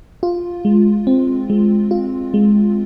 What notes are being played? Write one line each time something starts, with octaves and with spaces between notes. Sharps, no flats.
F4
G#3
C4
G#3
F4
G#3